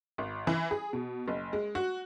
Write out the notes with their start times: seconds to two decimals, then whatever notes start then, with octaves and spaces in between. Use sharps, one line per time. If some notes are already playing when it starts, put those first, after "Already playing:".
0.18 G#1
0.47 E3
0.71 G#4
0.93 B2
1.28 F#1
1.53 G#3
1.75 F#4